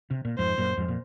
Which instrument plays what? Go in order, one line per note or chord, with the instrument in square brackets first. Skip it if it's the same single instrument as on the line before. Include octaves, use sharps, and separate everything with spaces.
[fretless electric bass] C3
A#2
[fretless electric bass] F2 G#2 [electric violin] C5
[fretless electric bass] F#2 A#2
F2 G#2
A#2